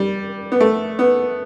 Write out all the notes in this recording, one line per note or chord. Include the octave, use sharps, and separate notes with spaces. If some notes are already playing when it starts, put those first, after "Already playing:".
Already playing: G3
B3
A3
B3